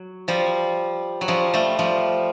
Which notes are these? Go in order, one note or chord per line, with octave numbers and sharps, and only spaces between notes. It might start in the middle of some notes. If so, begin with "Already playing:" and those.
Already playing: F#3
F3 G3
F#3
F3 G3
G3 A3
F3 G3